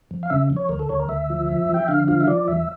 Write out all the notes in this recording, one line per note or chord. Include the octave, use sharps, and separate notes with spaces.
F2
F5
C#3 E5
F2
C#5
D2 A#4
A4
D2 C#5
A#4
D2 E5
F3
F2
F2 G5
D3 F5
F3 F5
E5
F3 D5
E2 E5